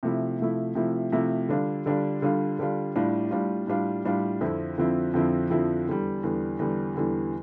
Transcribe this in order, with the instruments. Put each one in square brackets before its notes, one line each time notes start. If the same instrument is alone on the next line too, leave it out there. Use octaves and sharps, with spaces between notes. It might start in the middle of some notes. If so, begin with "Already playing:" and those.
[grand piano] C3 F3 A3 E4
C3 F3 A3 E4
C3 F3 A3 E4
C3 F3 A3 E4
D3 G3 D4 F4
D3 G3 D4 F4
D3 G3 D4 F4
D3 G3 D4 F4
A2 G3 D4 F4
A2 G3 D4 F4
A2 G3 D4 F4
A2 G3 D4 F4
F2 D3 F3 C4 E4
F2 D3 F3 C4 E4
F2 D3 F3 C4 E4
F2 D3 F3 C4 E4
E2 D3 G3
E2 D3 G3
E2 D3 G3
E2 D3 G3